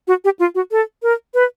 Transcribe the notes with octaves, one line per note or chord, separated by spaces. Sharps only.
F#4
G4
F4
F#4
A4
A#4
B4